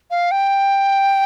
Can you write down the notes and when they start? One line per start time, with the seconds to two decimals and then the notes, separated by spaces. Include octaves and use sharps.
0.11 F5
0.31 G5